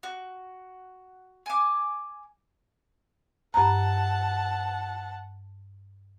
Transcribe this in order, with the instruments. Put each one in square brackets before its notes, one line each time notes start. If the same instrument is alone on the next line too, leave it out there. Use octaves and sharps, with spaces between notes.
[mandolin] F#4
G#5 D6
[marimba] G2 A#5 [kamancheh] F#5 A5